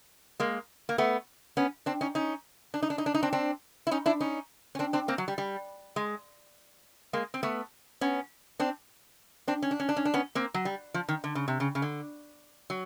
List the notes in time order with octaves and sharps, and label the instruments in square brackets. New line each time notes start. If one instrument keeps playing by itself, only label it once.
[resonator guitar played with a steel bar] G#3 A#3
A#3
A3 B3
B3 C#4
C4 D4
C#4 D#4
C#4 D#4
D4
D#4
D4
D#4
D4
D#4
C4 D4
C4 D4
E4
C#4 D#4
D4 E4
C#4 D#4
C#4
C4 D4
C4 D4
A#3 C4
F#3
G3
G3
G#3
G#3 A#3
C4
A3 B3
B3 C#4
C4 D4
C4 D4
C#4
D4
C#4
D4
C#4
D4
B3 C#4
A#3 C4
F#3
G3
F3
D#3
D3
C#3
C3
C#3
C#3
D3
F#3